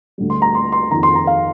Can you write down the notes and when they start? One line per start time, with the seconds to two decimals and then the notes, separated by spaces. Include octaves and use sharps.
0.18 D2 D3 G3
0.30 C6
0.42 A#5
0.55 C6
0.72 C6
0.91 F2 D#3 A#3 A#5
1.03 C6
1.15 A#5
1.27 F5